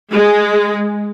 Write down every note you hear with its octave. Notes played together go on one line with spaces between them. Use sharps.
G#3